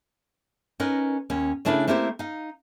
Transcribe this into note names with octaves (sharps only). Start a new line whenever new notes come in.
C#4 D#4 A#4 B4
D#2 C#4
C#3 A3 D4 E4 A#4 B4
A3 A#3 C4 E4 G4 C5
D#4 F5